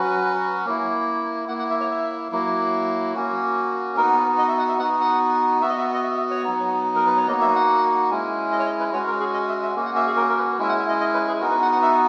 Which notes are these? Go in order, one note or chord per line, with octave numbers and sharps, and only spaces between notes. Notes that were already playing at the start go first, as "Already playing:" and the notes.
Already playing: F#3 C#4 F#4 B4
A#3 E4
A#3 E4 F#5
F#5
E5
C#5
E5
F#3 A#3 E4
A#3 C#4 F#4
B3 D#4 F#4 A#4
B4
D#5
E5
F#5
E5
B3 D#4 F#4 F#5
F#5
B3 F#4 E5
D#5
E5
D#5
E5
E5
C#5
F#3 B3 D#4
A#4
B4
C#5
A#3 D#4 F#4 D#5
E5
F#5
G#3 C#4 E4
D#5
C#5
D#5
B4
G#3 C#4 F#4 C#5
A#4
G#4
D#5
E5
E5
A#3 C#4 F#4
F#5
E5
G#4
A#4
A#4
B4
G#3 C#4 E4 E5
F#5
E5
D#5
D#5
B4
G#4
B3 D#4 F#4 A#4
B4
F#5
F#5
E5